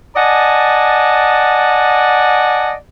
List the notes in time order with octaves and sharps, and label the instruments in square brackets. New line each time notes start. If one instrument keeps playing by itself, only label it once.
[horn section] D5 D#5 F#5 G#5 A5